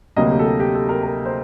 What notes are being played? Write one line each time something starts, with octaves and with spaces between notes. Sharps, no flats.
D2 C3 F#3 A#3 D#5
G4
A4
G4
G4
A4
A#4
A#4
C5